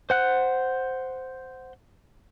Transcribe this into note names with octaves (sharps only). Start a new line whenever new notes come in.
C5 F#5 F#6